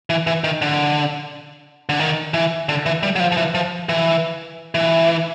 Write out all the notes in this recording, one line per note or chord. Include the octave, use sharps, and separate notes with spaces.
E3
E3
D#3
D3
D3
D#3
E3
D3
E3
G3
F#3
F3
F3
E3
F3
E3
E3